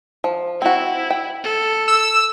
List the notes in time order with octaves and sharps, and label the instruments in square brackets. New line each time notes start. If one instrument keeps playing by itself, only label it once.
[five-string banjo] F3
[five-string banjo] C4 F#4 [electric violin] E4
[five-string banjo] G5
[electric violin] A4
[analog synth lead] E6